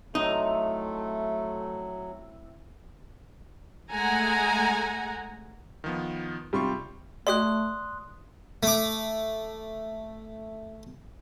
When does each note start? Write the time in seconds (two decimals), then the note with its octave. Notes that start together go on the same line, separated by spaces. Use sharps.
0.15 A2 F#3 A3 C4 D#4 E4
3.90 G#3 A3 F#5 G#5 A#5
5.84 D#3 F3 B3
6.53 C3 G3 F4 C6 C#6
7.27 A3 F#4 G4 D5 D#5 C6 D#6 F#6
8.63 A3 D6